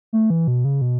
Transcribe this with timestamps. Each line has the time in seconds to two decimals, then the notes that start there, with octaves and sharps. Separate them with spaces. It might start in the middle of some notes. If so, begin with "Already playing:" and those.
0.13 A3
0.30 E3
0.48 B2
0.65 C#3
0.81 B2